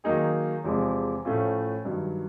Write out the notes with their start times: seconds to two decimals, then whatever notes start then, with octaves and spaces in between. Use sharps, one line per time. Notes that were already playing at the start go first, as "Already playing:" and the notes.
0.04 D#3 F#3 A#3 D#4 G#4
0.64 E2 C3 F3 G#3
1.25 A2 F3 A3 C#4 F4
1.85 G2 D#3 F#3